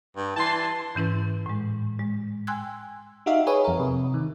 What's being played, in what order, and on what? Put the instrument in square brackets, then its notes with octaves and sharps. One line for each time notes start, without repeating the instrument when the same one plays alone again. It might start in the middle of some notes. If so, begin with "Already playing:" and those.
[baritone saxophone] G2
[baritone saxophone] E3 [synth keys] A5 C6
[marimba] G#2 E3 C#4 E4 B4
A2 G#3
G#3
G5 G#5 C6 E6 F#6 G#6
[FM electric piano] D#4 F#4 G4 E5 F5
G#4 B4 C#5 D#6
F2 A#4
C3
D#3